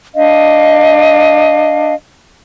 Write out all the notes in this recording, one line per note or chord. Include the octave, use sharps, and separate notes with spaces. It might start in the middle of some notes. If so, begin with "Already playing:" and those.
D4 D#5 F5